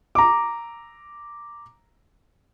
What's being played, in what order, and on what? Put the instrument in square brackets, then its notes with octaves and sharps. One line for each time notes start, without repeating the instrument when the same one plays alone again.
[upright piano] A#5 D6